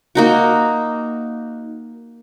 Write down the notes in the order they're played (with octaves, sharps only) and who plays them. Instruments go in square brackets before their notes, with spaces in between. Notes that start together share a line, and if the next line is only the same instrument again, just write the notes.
[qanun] A#3 D#4 F#4